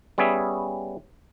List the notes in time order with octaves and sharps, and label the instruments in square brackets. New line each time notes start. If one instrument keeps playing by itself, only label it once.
[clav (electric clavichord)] G3 B3 C#4 G#4 E5